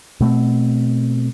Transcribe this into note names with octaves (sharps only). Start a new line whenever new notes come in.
B2 A3 A#3 C4